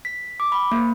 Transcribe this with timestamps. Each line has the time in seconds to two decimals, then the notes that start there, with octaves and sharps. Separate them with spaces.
0.05 B6
0.40 D6
0.52 B5
0.72 A#3